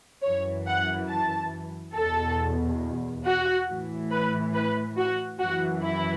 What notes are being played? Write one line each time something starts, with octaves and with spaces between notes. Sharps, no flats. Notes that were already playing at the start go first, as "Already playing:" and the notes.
F#2 E3 C#5
F#5
A5
E2 B2 A4
F#4
A2 E3
B4
B4
F#4
F#2 E3 F#4
E4